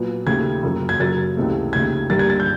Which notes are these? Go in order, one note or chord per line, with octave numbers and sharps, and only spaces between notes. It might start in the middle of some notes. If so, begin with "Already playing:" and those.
Already playing: A#2 F#3 B3
D#2 C#3 F3 A3 G#6
F#2 C#3 F3 A#3
G#6
F#2 C#3 F#3 A#3 A6
C#2 C3 E3 A3
D#2 C#3 F3 A3 G#6
G2 D3 G3 A#3 A6
G#6
A6
G6